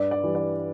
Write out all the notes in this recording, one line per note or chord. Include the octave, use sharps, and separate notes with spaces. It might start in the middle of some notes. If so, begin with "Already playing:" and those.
Already playing: G2 D5
D5
E3 G3
D5